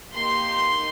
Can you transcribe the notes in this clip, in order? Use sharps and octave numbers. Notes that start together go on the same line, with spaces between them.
A#3 D#4 G4 C6